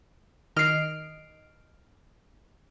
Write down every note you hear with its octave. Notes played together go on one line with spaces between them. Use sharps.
D#3 D#5 F6 C7 D7